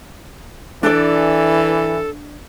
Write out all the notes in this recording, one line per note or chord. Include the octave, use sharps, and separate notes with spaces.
E3 D4 A4 D5